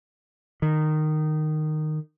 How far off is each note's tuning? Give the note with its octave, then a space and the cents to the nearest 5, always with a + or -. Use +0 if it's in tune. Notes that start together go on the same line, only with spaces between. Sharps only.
D#3 -15